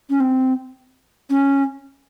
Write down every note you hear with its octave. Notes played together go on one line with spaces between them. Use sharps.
C#4
C4
C#4